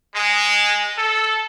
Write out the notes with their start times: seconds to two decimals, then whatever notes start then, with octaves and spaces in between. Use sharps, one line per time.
0.15 G#3
0.97 A4